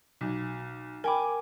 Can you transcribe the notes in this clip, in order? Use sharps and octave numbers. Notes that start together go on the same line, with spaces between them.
B1
A#4 G5 G#5 B5 D6